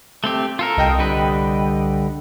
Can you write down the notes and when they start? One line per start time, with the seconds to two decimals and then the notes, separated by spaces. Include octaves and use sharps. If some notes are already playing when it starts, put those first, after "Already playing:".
0.24 A3 C4 G4
0.59 F4 A4 A#4
0.77 C2 D#5 G5
0.99 D3 G3 B4